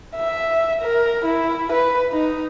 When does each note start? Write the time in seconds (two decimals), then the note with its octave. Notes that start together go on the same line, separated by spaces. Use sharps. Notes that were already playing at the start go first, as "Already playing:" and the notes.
0.16 E5
0.81 A#4
1.25 E4
1.72 B4
2.12 D#4